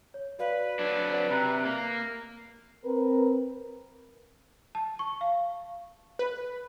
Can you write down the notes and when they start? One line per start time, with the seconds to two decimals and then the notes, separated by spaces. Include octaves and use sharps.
0.14 C#5
0.39 F#4 B4 D5 F5
0.79 F#3 D4 D5
1.10 C5 D5 F#5
1.30 C3 A#5 B5 F#6
1.65 A#3
2.84 C4 A#4 B4
4.75 A5
4.99 C#6
5.21 F5
6.19 B4